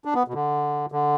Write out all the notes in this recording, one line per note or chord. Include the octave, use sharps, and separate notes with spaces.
D4
B3
B2
D3
D3